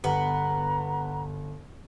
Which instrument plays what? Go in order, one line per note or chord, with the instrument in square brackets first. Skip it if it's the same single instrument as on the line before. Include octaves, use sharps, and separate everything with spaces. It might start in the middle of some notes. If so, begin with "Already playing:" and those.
[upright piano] G1 [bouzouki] B3 [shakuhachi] A#5